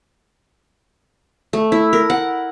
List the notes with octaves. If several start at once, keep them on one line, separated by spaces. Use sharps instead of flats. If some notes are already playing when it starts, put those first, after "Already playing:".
A3
E4
A#4
F#5